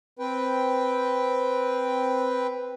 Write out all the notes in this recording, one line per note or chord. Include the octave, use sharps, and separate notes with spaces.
C4 B4 G5